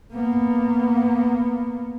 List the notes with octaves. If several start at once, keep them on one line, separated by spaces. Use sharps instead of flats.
A#3 B3